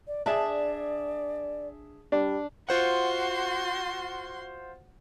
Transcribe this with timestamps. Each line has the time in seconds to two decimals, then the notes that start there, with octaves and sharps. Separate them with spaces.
0.07 D5
0.26 D4 G#4 D5 E5 A5
2.12 G3 D4
2.69 F4 F#4 C5 F#5 C6